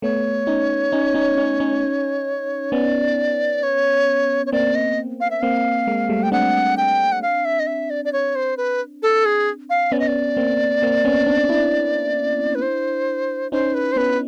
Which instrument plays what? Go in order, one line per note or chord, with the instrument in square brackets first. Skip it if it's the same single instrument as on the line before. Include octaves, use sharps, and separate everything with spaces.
[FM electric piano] A3 B3 [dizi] C#5
[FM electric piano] C#4 D#4
C#4 D#4
C#4 D#4
C#4 D#4
C#4 D#4
[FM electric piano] B3 C#4 [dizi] D5
[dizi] C#5
C#5
[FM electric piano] A#3 C4 [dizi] D5
[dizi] D#5
F5
E5
[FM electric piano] A#3 C4 [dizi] F5
[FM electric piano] G#3 A#3
G3 A3
[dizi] G5
[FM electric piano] C4 D4 [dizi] F#5
[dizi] G5
F#5
F5
E5
D#5
E5
D5
D5
C#5
C5
B4
A4
G#4
F5
[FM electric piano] B3 C#4 [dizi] D5
[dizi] D#5
D5
[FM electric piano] A#3 C4
A#3 C4
B3 C#4
C4 D4
D4 E4
[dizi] B4
C5
[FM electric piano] C#4 D#4 [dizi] C5
[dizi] B4
C5
[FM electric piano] B3 C#4 [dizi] B4